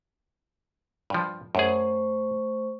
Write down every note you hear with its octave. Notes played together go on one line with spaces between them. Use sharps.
G2 F3
F#2 A3 G#4 C5 C#6